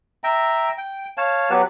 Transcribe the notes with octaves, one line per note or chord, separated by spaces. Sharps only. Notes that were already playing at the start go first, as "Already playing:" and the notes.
E5 G5 A#5
G5
C#5 F5 A5
F#3 B3 G4 B4